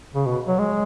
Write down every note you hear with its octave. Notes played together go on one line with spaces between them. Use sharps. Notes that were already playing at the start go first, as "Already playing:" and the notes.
C#3
B2
F#3
G#3